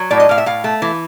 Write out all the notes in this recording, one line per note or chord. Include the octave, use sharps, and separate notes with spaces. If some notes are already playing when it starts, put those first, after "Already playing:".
Already playing: F#3
A2 D5
D#5
A2 F5
E5
A2 F5
A3
E3